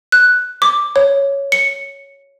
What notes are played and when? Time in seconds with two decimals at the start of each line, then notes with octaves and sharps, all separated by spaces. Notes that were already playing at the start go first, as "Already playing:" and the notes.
0.12 F#6
0.62 D6
0.96 C#5
1.52 C#7